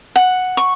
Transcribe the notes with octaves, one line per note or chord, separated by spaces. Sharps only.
F#5
C#6